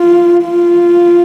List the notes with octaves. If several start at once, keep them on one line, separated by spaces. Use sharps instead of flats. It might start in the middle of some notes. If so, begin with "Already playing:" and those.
Already playing: F4
F4